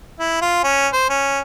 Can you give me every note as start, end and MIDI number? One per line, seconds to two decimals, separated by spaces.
0.19 0.38 64
0.41 0.59 65
0.64 0.88 61
0.93 1.07 72
1.10 1.40 61